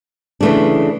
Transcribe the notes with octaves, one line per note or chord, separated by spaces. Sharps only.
C#3 E3 A3 D4